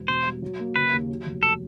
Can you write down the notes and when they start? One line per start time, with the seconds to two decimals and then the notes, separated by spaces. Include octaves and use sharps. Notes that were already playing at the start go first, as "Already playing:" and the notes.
Already playing: E1
0.08 B2 C5
0.25 G3
0.42 F#3
0.59 A#3
0.76 C#3 B4
0.93 D#2
1.09 F#3
1.26 F1
1.43 A4